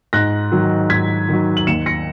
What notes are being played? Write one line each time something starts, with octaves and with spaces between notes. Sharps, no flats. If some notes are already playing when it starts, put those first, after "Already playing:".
G#2 F#6 A#6
D#3 F#3
G#2 G#6 B6
D#3 F#3
F#7
D#2 C#7 E7
A#6 C#7